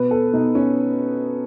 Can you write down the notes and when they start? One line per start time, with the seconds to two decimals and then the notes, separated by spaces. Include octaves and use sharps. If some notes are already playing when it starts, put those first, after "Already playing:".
Already playing: B2 B4
0.11 A4
0.33 B2 D#4
0.55 C#4